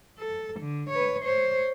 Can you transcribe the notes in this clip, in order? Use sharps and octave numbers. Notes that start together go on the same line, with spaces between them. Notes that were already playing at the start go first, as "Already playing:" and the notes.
A4
D3
B4 C#5
C5 C#5